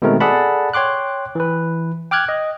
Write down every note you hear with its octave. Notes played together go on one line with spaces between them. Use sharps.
B2 D#3 G#3 A3 C4 A#4
G#4 A4 D5 F#5 A5 B5
C#5 G5 C6 D6 F#6
E3 B4
G5 D6 F6 F#6 G#6
D#5